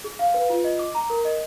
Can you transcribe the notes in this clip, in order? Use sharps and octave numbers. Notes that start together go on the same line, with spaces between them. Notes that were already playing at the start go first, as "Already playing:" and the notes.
G#4
F5
B4
F4
D#5
D6
A#5
A#4
D#5